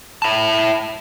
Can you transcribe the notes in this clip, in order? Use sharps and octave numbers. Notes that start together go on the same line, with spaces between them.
E4 A5